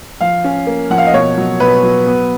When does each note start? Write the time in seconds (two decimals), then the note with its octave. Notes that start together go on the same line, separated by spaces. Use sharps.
0.21 F3 F5
0.44 C#4
0.67 A#3
0.90 F3 F#5
0.98 F5
1.07 D#5
1.13 B2 C#5
1.38 F#3
1.60 B2 B4
1.83 F#3
2.07 B3